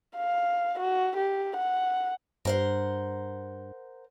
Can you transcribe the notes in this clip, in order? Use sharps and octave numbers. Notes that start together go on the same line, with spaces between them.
F5
F#4
G4
F#5
G2 A#4 C5 F#5